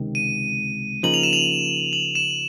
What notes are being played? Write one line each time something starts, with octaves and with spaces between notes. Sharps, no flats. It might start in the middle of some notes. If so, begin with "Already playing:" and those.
Already playing: C#2 C3 D#3
D#7
C#3 F3 A#3 D#4 F#7
F7
E7
F7
F#7
E7